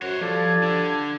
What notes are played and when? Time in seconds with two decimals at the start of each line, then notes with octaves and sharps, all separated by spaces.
0.02 F#2 F#4 C5 C#5
0.21 F3 G3 A4 D5 G#6
0.63 D3